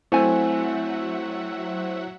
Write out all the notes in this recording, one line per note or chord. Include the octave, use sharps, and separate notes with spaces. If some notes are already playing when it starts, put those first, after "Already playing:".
F#3 A3 C4 E4 A4 E5 F#5 G#5